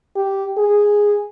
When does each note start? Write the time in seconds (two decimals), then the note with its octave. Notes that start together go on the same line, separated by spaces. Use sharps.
0.16 G4
0.57 G#4